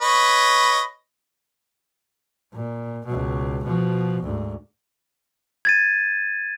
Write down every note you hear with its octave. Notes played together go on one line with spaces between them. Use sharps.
B4 C#5 D#5
A#2
C#2 B2
B2 F3
D2 G#2
G#6 A6 D#7